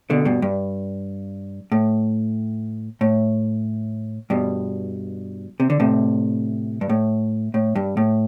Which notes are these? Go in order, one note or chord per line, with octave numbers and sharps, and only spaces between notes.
B2 D3
G2 B2
G2
A2
A2
G2 B2
C3
D3
A2 C3
G2
A2
A2
G2
A2